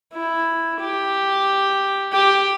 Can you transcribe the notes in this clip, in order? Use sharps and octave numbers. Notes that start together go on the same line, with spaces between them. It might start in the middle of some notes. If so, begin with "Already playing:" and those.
E4
G4
G4